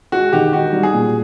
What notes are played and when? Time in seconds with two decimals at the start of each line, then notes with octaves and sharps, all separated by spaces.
0.12 G#3 F#4
0.33 D#3 G4
0.53 D#4 F#4
0.73 G3
0.83 G#4
0.93 A#2